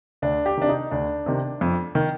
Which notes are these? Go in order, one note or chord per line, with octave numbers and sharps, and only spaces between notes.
D2 D4
G4
C3 D#3 D4
D#4
D2 D4
C3 D#3
F2
D#3